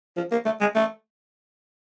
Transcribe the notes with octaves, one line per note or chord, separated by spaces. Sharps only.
F3
A#3
A3
G#3
A3